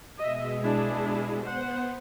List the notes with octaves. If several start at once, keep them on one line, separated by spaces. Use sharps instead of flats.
B2 G#3 D#5 E5
D4 E4 G#4
B3 C5 F#5